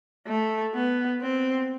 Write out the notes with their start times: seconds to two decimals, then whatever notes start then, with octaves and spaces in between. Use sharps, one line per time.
0.28 A3
0.75 B3
1.21 C4